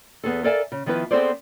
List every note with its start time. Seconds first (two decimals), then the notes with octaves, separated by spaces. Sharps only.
0.24 E2 B3 G#4 A4
0.44 A4 A#4 D5 E5 F5 G#5
0.72 C#3
0.86 D#3 F3 B3 E4 B4
1.11 B3 C4 G#4 A4 C5 D5